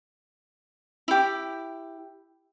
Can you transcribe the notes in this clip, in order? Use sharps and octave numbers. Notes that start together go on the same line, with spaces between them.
E4 G4